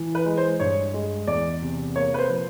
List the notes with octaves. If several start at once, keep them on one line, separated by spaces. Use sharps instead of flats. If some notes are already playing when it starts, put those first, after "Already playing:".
Already playing: E3
B4
G#3
C5
G2 C#5
G#3
E2 D5
C3
A#3 C#5
B4
C5
F3